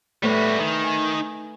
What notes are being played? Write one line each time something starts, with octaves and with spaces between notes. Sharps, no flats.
A2 G3 F#4 B4
G#5
D#3
G#5